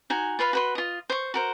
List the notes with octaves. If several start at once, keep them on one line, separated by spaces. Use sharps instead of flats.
D#4 F#4 G#5
F4 B4 F5 B5
F#4 B4 C6
F4 D#5
C5 C#6
F#4 A#4 C5